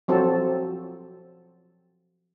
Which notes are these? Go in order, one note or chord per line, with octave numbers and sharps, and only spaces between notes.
F3 F#3 C4 A4